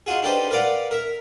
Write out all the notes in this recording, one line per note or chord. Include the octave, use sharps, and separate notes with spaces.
D#4 F4 F#4 G#4
D4 D#4 G4 A4 B4 C5
A#4 B4 D5 F5 F#5
A#4 E5